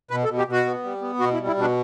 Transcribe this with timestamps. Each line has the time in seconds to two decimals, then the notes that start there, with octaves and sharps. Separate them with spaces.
0.11 B2 B4
0.24 A4
0.29 B2
0.38 G4
0.47 B2 F#4
0.66 B3
0.84 G3
1.01 B3
1.20 B2 F#4
1.34 E4
1.38 G3
1.47 E4
1.56 B2 D4